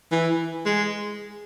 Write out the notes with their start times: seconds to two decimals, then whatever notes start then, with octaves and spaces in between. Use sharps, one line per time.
0.12 E3
0.66 G#3